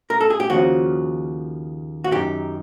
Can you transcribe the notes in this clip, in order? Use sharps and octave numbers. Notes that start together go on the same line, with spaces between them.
A#4
A4
G#4
G4
D#2 C#3 F3 F#4
F#4
F#2 D#3 G4